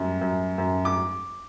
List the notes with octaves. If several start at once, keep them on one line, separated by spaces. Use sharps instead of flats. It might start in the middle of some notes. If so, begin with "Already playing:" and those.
Already playing: F#2 G3
F#2
F#2
D6